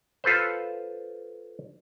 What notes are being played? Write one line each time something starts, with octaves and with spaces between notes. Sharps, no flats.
F4 A4 B4 C5